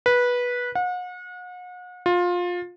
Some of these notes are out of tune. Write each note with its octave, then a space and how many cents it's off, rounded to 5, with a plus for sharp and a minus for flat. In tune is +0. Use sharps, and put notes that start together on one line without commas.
B4 -15
F#5 -40
F4 +20